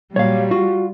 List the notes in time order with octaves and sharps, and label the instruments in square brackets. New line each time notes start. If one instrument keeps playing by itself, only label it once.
[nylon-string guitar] A#2 F#3 [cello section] G3 [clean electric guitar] C#5 F5
[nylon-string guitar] F4 [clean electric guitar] F#4